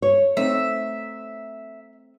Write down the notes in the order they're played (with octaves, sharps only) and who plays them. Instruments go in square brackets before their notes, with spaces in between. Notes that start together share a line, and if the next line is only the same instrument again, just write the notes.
[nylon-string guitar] C#5
[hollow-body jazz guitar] A3 C4 D#4 [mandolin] E5